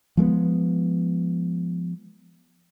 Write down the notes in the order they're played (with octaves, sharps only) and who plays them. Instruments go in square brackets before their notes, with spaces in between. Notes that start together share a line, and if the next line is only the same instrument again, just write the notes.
[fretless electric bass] F3 G#3 A3 B3